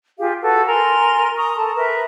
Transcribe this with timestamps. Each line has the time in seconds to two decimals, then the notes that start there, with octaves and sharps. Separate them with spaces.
0.19 F4 G4 G#4 F5
0.41 F#4 A4 B4
0.67 A#4 G#5 C6
1.37 A#5 C#6 D#6
1.56 A4 A5
1.76 A#4 B4 E5